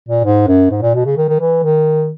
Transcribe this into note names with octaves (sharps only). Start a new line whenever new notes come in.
A#2
G#2
F#2
G#2
A#2
B2
C#3
D#3
D#3
E3
D#3